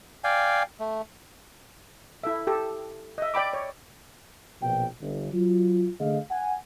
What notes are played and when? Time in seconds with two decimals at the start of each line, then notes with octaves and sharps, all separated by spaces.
0.24 D5 F5 G5 G#5
0.80 A3
2.24 E4 A4 E5
2.47 G4 A4
3.18 D#5 E5
3.34 D5 G5 B5 D6
3.53 C#5
4.62 A#1 B2 G5
5.01 G1
5.34 F#3 F4
6.00 D3 A3 G#4 D#5 F5
6.31 F#5 G#5